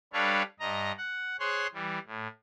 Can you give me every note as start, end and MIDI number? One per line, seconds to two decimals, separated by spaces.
0.13 0.43 55
0.13 0.43 62
0.13 0.43 69
0.13 0.43 71
0.13 0.43 73
0.13 0.43 77
0.60 0.92 43
0.60 0.92 75
0.60 0.92 82
0.97 1.36 78
1.39 1.67 68
1.39 1.67 72
1.39 1.67 73
1.39 1.67 84
1.39 1.67 90
1.73 1.98 52
1.73 1.98 55
2.07 2.27 45